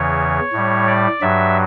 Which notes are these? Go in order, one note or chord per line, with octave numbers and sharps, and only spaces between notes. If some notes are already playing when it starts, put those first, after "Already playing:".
Already playing: E2 C#3 E3 C#5
A2 G3
D5
G2 F#3 E5